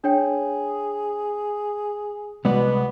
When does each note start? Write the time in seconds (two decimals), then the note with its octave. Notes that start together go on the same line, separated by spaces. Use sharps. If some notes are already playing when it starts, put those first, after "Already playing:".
0.04 D4 G#4 C#5 G5
2.45 C2 B2 G#3 B3 D5